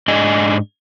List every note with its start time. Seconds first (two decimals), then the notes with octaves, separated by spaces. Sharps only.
0.08 G#2 D4 D#5 G#5